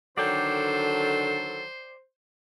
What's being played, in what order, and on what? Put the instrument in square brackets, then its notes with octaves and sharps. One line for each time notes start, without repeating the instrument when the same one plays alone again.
[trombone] D3 [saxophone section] D#3 F#3 A4 [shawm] C5 [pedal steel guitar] D5 G5